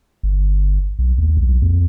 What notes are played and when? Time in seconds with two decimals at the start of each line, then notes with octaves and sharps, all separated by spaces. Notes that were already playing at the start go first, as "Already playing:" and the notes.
0.23 G1
0.99 B1
1.18 D#2
1.37 B1
1.62 F2